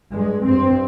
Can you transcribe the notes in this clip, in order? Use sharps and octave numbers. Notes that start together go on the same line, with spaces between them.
G2 G#3
G2 C4